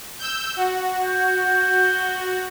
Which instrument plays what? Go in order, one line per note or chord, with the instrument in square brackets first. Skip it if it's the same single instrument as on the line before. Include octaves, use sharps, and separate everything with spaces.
[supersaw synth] E6 G6
F#4
[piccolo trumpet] G6